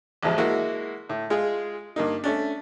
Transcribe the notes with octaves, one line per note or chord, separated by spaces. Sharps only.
A1 E2 F3 G#3
G#3 A#3 E4 F#4
A2
G#3 F4 G#4
G2 A#3 D#4
A3 C#4 D4